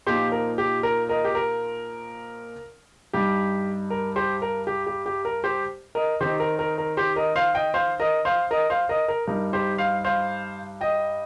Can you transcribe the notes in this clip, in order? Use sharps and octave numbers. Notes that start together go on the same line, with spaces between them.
A#2 F3 C4 D#4 G4 C5
A#4
G4
A#4
A#4 D#5
G4
A#4
G2 G3 D#4 G4
A#4
G4 C5
A#4
G4
G4
G4
A#4
G4 C5
A#4 D#5
D#3 C4 D#4 G4 C5
A#4
A#4
A#4
G4 C5
A#4 D#5
C5 F5
D#5 G5
C5 F5
A#4 D#5
C5 F5
A#4 D#5
C5 F5
A#4 D#5
A#4
G2 G3 D#4 A#4
G4 C5
C5 F5
C5 F5
D#5 G5